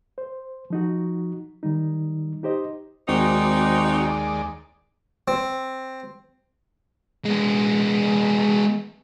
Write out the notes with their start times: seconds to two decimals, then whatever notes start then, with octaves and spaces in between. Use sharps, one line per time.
0.18 C5
0.70 F3 D#4 F#4
1.63 D#3 G3 D#4
2.43 D#4 G4 C5 D#5
3.08 G#1 D#2 G#3 C4 D#4 F#4 D5
5.28 C4
7.25 G#3 B3